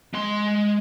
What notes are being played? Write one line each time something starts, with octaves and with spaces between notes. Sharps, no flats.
G#3 C6